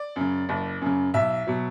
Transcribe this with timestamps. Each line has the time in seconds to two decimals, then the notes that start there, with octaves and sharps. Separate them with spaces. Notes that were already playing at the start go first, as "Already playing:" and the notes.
Already playing: D5
0.16 F#2 C#3
0.49 F#1
0.81 F#2 C#3
1.14 B1 E5
1.47 B2 F#3